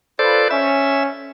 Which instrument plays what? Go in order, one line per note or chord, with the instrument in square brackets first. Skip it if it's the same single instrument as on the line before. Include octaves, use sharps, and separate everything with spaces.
[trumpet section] F4 B4 [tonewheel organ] A4 C5 D5
[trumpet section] C#4 [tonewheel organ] E5